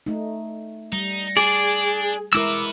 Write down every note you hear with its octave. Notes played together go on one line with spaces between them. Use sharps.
A3 D#4
G3 D#4
D4 G#4 D5
G#3 E4 F#4 A#4 B4 D6 E6